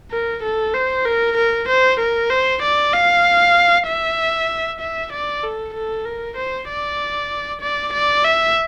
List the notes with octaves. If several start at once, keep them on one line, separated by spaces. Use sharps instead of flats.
A#4
A4
C5
A#4
A#4
C5
A#4
C5
D5
F5
E5
E5
D5
A4
A4
A#4
C5
D5
D5
D5
E5